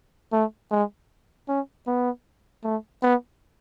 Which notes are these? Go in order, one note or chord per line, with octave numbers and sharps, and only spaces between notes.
A3
G#3
C#4
B3
A3
B3